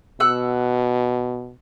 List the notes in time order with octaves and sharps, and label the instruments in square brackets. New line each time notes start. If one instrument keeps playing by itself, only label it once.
[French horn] B2 [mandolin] F#5 E6